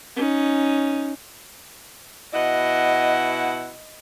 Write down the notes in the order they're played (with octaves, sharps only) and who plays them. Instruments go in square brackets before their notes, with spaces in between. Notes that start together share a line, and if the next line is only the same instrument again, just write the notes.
[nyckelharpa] C#4 D#4
[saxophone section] B2 E4 F#5 [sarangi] D#5